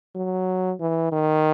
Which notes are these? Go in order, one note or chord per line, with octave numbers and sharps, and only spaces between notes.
F#3
E3
D#3